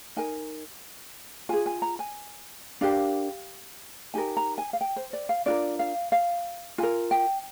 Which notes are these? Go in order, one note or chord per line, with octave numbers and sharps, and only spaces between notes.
D#4 A#4 G#5
F4 G#4 G#5
G#5
A#5
G#5
D4 G4 A#4 F5
D#4 G4 A#4 G#5
A#5
G#5
F5
G5
C5
D5
F5
D4 F4 A#4 D5
F5
F5
F4 A#4 G#5
G5